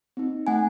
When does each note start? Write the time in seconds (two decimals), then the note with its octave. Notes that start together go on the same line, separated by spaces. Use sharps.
0.17 C4 D#4
0.47 A3 F#5 G#5